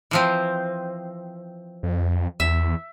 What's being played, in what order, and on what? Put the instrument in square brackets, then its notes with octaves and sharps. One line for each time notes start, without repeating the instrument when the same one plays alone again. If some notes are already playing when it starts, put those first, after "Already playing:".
[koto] E3 F3 C4
[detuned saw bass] F2
[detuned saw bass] E2 [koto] E5